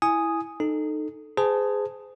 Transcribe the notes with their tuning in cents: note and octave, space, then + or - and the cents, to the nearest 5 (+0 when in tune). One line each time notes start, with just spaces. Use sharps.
E4 +0 G#5 +0 D#6 +0
D#4 -20 A4 +0
G#4 +0 C5 -40 A5 +0